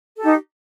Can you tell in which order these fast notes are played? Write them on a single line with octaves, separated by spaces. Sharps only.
A4 G4 D#4